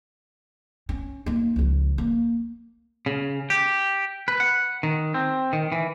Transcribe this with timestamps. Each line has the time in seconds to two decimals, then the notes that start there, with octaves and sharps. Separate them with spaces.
0.89 C#4
1.26 A#3 D#4
1.56 C#2 F3
1.98 A#3
3.06 C#3
3.50 G4
4.28 B4
4.40 F#5
4.83 D#3
5.14 C4
5.53 D#3
5.72 E3